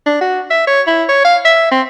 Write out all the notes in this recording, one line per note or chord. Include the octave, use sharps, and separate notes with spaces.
D4
F#4
E5
C#5
E4
C#5
F5
E5
C4